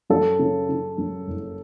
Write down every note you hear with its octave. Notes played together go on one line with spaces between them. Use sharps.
F#2 A4
C#3
C#3
F#2
F#1